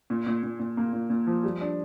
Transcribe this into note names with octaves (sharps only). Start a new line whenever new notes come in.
A#2
A#2
A#2
A#2
A#3
A#2
A#2
F3
G3
D4